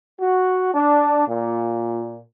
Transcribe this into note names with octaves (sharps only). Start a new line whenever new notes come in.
F#4
D4
A#2